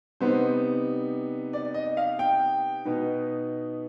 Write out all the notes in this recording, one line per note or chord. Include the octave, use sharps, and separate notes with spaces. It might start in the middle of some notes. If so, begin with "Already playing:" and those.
C3 G3 B3 D#4 C5
D5
D#5
F5
G5
B2 B3 D#4